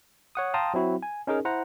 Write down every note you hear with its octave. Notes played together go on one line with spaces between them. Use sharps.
C#5 F#5 D#6
F5 G5 A5 A#5 C6 D#6
F#3 C4 E4 F#4
G#5
C#4 D#4 G#4 A#4
E4 C5 F#5 A#5